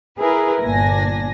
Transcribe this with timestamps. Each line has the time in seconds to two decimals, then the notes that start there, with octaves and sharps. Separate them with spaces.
0.19 E4 G#4 A#4 B4
0.62 G1 A#2 D4 G#5 A#6